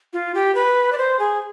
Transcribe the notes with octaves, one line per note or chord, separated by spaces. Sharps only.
F4
G4
B4
D5
C5
G#4